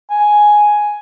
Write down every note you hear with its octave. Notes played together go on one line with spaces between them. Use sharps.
G#5